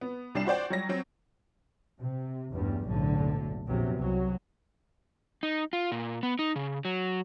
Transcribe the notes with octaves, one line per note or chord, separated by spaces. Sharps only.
B3
C2 G3 D4 C7 E7
F#4 C5 D5 G5
F#3 G3 A#6
F#3 C4
C3
A1 E2 G2 G3
F#1 B1 A2 D3
A#1 E2 C3 F#3
C2 F#3
D#4
F4
A#2
B3
D#4
C#3
F#3